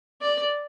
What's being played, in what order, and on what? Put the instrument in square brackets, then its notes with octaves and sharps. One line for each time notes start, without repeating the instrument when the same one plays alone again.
[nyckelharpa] D5